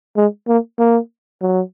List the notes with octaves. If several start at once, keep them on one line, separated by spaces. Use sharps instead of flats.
G#3
A#3
A#3
F#3